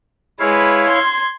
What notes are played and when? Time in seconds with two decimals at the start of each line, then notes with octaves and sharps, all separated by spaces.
0.39 G#3 E4 B4 C#5 F5
0.89 C6 G#6